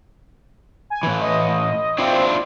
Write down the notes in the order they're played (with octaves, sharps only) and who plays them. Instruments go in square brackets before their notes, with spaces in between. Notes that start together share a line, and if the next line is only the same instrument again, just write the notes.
[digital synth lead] G#5
[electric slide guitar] A2 E3
[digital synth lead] D#5
[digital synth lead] C4 [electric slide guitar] D4 E4 F4